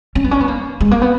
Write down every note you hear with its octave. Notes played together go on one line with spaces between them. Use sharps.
C#4
B3
C#4
B3
A#3
G#3
A#3
B3